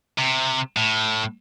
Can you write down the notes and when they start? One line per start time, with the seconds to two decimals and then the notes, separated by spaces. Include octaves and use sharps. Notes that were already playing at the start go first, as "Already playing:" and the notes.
0.19 C3
0.76 A2